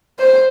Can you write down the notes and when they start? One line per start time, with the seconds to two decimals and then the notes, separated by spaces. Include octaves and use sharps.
0.19 C5